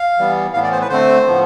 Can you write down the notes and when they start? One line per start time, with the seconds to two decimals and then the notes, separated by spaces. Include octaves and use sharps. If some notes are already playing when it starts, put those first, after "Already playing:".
Already playing: F5
0.19 E3 G3 B3
0.53 A2 E3 B3 F5
0.63 D5
0.72 C5
0.81 B4
0.89 D3 A3 C4 C5
1.26 A2 F3 B3